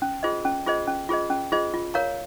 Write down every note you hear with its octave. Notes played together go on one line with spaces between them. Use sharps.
C#4
F4 G#4 C5 D#5
C#4
F4 G#4 C5 D#5
C#4
F4 G#4 C5 D#5
C#4
F4 G#4 C5 D#5
F4
A#4 C#5 F5 A#5